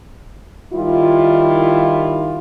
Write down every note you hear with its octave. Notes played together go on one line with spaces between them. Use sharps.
D#3 G3 E4 F4